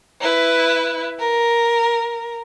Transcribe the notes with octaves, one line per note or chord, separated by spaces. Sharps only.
E4 B4
A#4